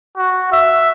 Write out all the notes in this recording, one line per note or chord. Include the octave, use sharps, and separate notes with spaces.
F#4
E5